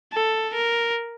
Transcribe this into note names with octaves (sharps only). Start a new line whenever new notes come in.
A4
A#4